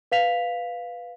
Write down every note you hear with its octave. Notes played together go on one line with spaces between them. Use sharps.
B4 F5 B6 F7